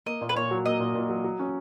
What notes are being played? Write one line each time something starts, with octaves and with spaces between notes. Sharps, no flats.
A#3 D#5
A#2
B4
A#2 C#5
F#3
A#3 D#5
A#2
A#2
F#3
F#3
C#4